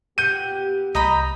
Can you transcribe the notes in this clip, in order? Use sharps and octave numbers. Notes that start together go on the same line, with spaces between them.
A#2 B3 G4 F#5 G6 D#7
C2 D#5 A#5 B5 G6